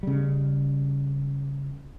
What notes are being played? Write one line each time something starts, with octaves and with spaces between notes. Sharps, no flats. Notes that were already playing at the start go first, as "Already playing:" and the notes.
C#3 G3